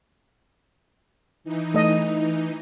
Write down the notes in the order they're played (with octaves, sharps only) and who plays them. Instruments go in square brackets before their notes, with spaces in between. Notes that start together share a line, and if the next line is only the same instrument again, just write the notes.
[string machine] E3 D#4
[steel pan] A3 D#5